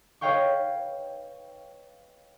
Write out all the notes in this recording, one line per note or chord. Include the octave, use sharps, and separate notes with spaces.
B4 C#5 D#5 F5 G5 C#6